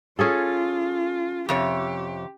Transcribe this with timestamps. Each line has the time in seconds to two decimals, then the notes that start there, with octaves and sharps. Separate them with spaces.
0.19 C#4 F4 G#4 A4
1.49 F2 C3 G4 C#5